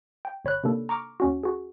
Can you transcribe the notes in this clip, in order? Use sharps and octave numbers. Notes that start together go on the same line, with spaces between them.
G5
G1 C#5 B5 F#6
C3 D#3 A#3 D4 A4
A#5 C#6 D6 F6
D#2 C#4 F#4
F#4 G#4